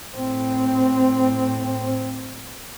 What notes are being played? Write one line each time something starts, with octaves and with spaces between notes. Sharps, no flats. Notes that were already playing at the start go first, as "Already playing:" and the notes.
A2 C4